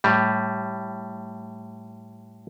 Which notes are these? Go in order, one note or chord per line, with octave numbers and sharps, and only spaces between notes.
A2 G3